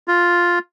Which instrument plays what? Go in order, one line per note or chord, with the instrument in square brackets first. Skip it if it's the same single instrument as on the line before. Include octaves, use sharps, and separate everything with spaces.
[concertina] F4